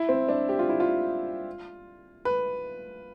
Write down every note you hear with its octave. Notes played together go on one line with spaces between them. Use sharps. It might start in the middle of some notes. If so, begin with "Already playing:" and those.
Already playing: E4
C4
D4
G4
F4
E4
F4
B4